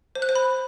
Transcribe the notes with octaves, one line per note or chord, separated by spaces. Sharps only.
C5
F#6
C5
B5